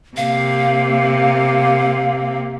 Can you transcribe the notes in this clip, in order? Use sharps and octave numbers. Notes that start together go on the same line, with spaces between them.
C3 A#3 F5